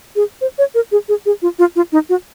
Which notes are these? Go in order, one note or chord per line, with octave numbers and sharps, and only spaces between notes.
G#4
C5
C#5
A#4
G#4
G#4
G#4
F4
F4
F4
D#4
F#4